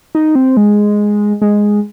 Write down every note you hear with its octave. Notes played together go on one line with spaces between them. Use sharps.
D#4
C4
G#3
G#3